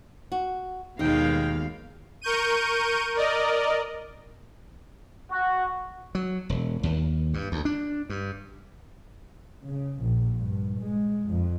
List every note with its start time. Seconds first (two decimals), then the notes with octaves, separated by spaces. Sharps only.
0.32 F#4
0.99 D#2 B2 D#3 G#3 D#5 F5 G5
2.21 A#4 C#6 G6 D#7
3.15 A#4 D5 D#5
5.31 F#4
6.15 F#3
6.49 E1
6.83 D#2
7.34 G2
7.52 D2
7.65 D4
8.10 G2
9.65 C#3
10.02 A#1
10.39 G2
10.80 G#3
11.26 F2